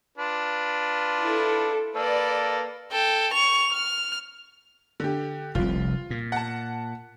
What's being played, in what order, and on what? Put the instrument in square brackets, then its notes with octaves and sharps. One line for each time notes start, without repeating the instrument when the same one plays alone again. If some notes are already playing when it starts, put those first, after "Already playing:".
[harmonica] D4 F4 B4
[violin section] E4 A4
[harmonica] A#3 A4 [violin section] B4 D5
[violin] A4 G5
C#6 F7
F6
[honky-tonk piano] D3 G4
[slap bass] F1 C2 [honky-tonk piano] F4
[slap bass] A#2
[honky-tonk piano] F#5 A5